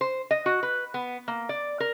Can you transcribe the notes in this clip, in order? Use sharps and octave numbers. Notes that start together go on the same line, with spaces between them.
C5
D#5
F#4
B4
B3
A#3
D5
A#4